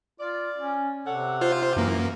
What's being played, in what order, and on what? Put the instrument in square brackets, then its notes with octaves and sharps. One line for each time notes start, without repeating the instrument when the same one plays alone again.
[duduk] F4 [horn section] D5
[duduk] C#4
[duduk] C3 [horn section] A4 C#5 F#5
[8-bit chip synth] F4 C5
[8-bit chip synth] F#2 A#3 [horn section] E3